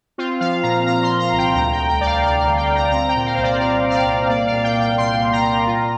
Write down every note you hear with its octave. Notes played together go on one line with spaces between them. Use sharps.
C4 F4
F3 F5
A#2 A#5
A#2 A#5
C6
F3
A#5
C2
G5
D2 A#5
G5
D2
G5
D2 D5
F5
D2 F5
F5
D3
G5
D2
A#5
C4 A#5
G5
A#2
F5
C2 C5
D5
C4 F5
C4
F5
D5
C2
A#3 D5
F5
A#2
G5
A#2
G5
A#2 C6
A#2
A#5
A#2
F4